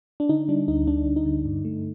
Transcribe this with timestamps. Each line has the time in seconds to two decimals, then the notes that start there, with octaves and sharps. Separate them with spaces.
0.20 D4
0.29 D3 D#4
0.48 G3 D4
0.68 D2 D#4
0.87 D3 D4
1.07 D2
1.16 D#4
1.26 D3
1.45 G2
1.65 A3